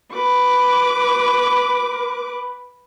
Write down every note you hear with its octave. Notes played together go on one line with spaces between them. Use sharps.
B4 D6